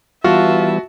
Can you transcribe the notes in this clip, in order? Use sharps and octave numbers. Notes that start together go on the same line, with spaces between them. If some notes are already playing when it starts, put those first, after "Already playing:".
E3 G3 B3 F4 F#4 E5 A5